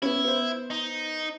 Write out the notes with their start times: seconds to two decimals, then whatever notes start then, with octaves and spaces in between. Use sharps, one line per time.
0.02 B3 C#4 E4
0.24 B3 C5
0.70 D#4